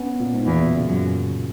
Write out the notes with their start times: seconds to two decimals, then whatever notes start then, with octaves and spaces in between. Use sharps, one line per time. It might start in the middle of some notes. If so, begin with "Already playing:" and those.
Already playing: B3 C#4
0.20 A#2
0.34 G#2
0.46 E2 A#2
0.60 B2
0.73 C#3
0.87 F#2